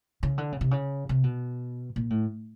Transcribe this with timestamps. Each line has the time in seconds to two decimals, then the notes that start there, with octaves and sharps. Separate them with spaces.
0.23 C#3
0.38 D3
0.52 C#3
0.61 C3
0.71 C#3
1.09 C3
1.24 B2
1.96 A#2
2.10 A2